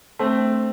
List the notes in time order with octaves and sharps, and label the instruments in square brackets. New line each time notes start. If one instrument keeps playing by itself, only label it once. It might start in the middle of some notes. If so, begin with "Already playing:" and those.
[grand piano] A3 C4